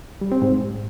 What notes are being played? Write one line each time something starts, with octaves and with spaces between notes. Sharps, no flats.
G3
C4
G#2